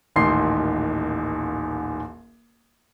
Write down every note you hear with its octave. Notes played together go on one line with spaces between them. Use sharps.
D#1 A1 D#3 C6 C7